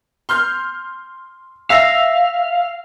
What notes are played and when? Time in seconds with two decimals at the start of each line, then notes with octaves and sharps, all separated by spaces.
0.29 C6 F6 G6
1.70 E5 F5 E6 A#6